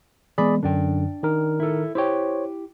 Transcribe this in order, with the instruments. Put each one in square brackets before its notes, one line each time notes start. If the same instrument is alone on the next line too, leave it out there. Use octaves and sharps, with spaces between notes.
[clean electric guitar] E3 G#3 B3 [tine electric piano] G#4 D5 B5
[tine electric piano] F#2 D3 [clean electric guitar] D4 D5 G5
[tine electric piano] D#3 A#4
[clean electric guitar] E4 A4
[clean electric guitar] E4 G4 G5 [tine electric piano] C5 C#5